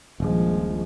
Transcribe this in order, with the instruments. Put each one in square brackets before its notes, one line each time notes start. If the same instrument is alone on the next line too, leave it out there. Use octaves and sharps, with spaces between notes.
[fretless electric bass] D#1 A#1 [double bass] F3 G#3